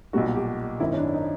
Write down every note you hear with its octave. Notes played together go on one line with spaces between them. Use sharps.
B1 A#2 G3 F#4
G4
G#1 F#2 D#3 E4
C#4
D4
D#4